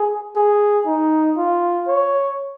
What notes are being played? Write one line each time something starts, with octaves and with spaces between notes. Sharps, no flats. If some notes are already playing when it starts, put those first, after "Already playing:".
Already playing: G#4
G#4
D#4
F4
C#5